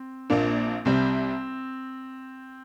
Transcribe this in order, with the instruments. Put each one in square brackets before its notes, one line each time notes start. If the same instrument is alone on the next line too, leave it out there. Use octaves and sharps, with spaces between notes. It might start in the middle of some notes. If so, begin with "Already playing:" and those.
Already playing: [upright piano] C4
[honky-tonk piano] A#1 A#2 A#3 D4
[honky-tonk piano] C2 C3 G3 [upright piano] C4